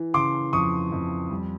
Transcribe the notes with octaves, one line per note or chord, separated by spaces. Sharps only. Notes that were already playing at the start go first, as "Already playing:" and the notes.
Already playing: E3
C#3 C6 D6
F2 C#6 D#6
F2
G3